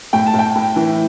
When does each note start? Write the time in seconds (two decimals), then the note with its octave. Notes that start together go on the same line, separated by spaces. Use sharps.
0.13 A2 G5
0.26 A5
0.33 A2
0.39 G5
0.55 A2
0.76 E3